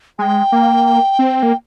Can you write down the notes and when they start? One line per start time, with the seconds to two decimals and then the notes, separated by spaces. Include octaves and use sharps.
0.19 G#3 G5 G#5
0.52 A#3
1.19 C4
1.43 A#3